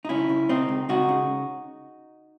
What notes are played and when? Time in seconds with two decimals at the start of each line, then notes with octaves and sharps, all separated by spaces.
0.05 D#4
0.09 C#2 C#4 E4
0.29 C#2
0.49 C#2 C4 D#4
0.69 C#2
0.89 C#2 D#4 F#4
1.09 C#3